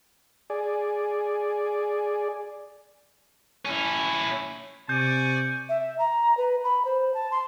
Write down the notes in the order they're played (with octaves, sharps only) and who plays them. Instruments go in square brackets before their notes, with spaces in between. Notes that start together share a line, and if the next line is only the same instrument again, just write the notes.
[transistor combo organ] G#4 D5
[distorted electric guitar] C#4 E4
[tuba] C3 [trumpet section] D5 G#5 C#6 [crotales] G6
[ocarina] E5
A#5
B4
B5
C5
A5
C6